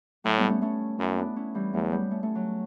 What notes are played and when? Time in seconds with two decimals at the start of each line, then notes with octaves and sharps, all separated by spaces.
0.24 A2 F#3 A3
0.37 G3 B3
0.49 A3 C#4
0.62 A3 C#4
0.99 F#2 C#4 E4
1.18 B3 D4
1.36 C#4 E4
1.55 E3 G3
1.73 E2 F#3 A3
1.92 G3 B3
2.11 A3 C#4
2.23 A3 C#4
2.35 F#3